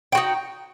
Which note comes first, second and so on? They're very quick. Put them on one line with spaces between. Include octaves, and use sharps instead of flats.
G5 F#4 D#4